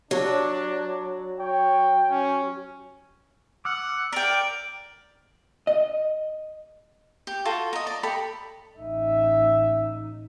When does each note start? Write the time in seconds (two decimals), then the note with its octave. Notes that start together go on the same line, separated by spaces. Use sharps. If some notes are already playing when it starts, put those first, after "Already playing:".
0.11 F#3 D4
1.40 C#5 G5
2.11 C#4
3.65 F#5 D6 E6 F6
4.13 A#4 D5 G5
5.67 D#5
7.27 G4
7.45 F4 F#4 A4
7.73 D#5 A#5
7.87 D5
8.03 G4 A4 B5
8.77 A1 D#4 E5